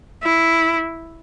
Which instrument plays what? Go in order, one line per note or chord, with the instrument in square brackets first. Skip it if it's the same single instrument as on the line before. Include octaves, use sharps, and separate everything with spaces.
[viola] E4